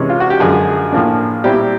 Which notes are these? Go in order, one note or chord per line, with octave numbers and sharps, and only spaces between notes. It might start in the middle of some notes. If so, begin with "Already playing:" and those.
Already playing: C3 E3 G#3 C#4
F4
F#4
G4
F#2 D3 F3 G#3 G#4
A2 F3 A#3 D4
A#2 G3 C4 E4 G4